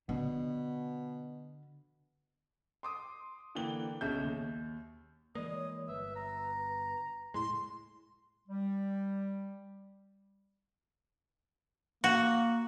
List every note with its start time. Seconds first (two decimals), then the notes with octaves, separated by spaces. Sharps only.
0.09 B2 D3
2.83 C6 D6 D#6
3.55 D3 E3 A#3 G5 G7
4.01 B1 C#3 C#4 E5 G6
4.22 D#2
5.35 E3 G#3 A#3 D5 D#6
5.53 C#5
5.88 G1 B4 E5
6.16 A#5
7.34 F#1 A2 G#3 E4 C6
8.48 G3
12.04 A#3 F#4